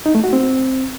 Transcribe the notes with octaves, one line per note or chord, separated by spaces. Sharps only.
D#4
A3
F#4
C4